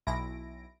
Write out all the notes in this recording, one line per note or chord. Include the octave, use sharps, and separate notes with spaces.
B1 E4 A#6 D7